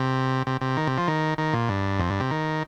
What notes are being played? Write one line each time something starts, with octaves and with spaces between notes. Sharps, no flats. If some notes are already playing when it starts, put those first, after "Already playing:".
Already playing: C3
C3
C3
D#3
C3
F3
D#3
D#3
A#2
G2
F2
G2
C3
D#3